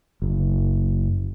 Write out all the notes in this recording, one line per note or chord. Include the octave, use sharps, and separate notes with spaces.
F#1